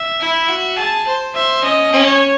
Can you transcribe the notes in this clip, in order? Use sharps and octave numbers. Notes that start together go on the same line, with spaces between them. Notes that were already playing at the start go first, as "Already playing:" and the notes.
Already playing: E5
E4
F#4
G#4 A5
C5
C5 E5
C#4 D#5
C#4
C#5